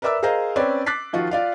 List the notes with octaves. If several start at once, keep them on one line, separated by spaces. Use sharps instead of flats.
A#4 B4 D5 E5 D6 E6
G#4 A#4 C5 D#5 F5 A#5
C4 C#4 B4 D5
D6 F#6 A6 B6 C7
D#3 F3 F4 F#4
F4 D5 F5